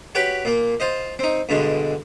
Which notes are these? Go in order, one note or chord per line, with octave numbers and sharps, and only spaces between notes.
F#4 G4 B4 C#5 G5
A#2 A#3
F4 C5 D#5
C4 D#4
G2 B2 D3 G#3